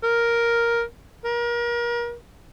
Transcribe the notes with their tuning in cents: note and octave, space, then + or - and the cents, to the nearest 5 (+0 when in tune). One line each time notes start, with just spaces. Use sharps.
A#4 +5
A#4 +35